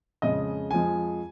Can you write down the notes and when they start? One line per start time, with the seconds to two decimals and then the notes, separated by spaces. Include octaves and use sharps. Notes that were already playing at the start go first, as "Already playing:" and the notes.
0.22 F2 C#3 G#3 D#5
0.71 F2 F3 G#3 G#5